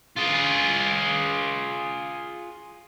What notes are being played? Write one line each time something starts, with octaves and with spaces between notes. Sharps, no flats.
F4 G#4